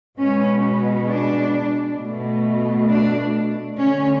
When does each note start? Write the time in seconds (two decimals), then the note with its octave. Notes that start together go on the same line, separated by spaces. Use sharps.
0.18 B2 G#3 B3 C#4
1.09 D4
1.99 B2 A3
2.89 D4
3.78 D3 A3 C#4